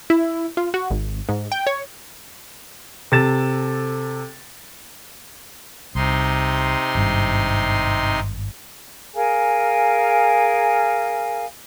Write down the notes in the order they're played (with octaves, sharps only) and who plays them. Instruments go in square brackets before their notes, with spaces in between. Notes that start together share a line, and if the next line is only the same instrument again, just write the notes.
[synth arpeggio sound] E4
F4
F#4
G#1
G#2
G5
C#5
[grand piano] C3 A4 A6 E7
[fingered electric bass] C2 [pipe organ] C3 D#4 C6
[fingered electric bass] G#1 G2
[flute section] G#4 A#4 F5 G#5